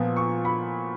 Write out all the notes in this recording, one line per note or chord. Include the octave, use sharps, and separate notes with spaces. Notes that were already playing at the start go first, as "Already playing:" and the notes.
Already playing: A#2 F3 B3
C#6
B5